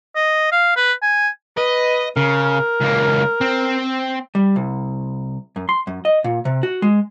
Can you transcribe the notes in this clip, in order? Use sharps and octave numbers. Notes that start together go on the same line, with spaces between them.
D#5
F5
B4
G#5
B4 D#5
C#3 A#4
C#2 A#3
C4
G3
C2
F#2
C6
F#2
D#5
A#2
C3
F#4
G#3